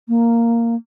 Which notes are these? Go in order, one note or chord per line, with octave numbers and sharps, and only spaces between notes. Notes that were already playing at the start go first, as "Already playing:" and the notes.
A#3